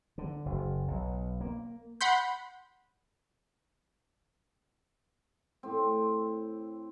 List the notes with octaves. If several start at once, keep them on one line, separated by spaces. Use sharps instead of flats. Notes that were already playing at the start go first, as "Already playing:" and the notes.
D3
F#1
B1
A#3
F#5 B5 C6 G6
A2 C4